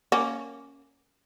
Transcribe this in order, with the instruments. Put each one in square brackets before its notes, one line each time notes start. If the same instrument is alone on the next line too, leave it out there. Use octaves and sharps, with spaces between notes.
[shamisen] A#3 C#4